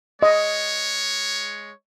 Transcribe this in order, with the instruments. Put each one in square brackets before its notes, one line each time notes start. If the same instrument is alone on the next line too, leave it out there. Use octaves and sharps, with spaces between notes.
[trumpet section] G#3 C#5 [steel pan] D#5